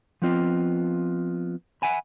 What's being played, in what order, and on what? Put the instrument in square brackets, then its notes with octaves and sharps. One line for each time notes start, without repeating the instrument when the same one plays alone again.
[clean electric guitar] F3 B3 C4 F4 D#5
E5 F#5 G#5 B5